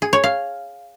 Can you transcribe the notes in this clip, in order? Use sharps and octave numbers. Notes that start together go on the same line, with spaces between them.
G#4
C#5
F5